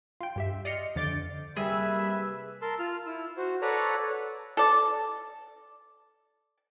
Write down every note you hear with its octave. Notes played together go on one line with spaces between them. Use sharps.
F4 G5
G2 G4 E5
D5 D#5 C6 F6 C#7
F2 D3 D5 D6 G6 A6
C3 G3 A#3 G#4 B4 E5
A#4 A5 C6 E6
F4 F6
E4 E6
F#4 C5
A4 B4 C#5 D5 F#5 A#5
A4 D5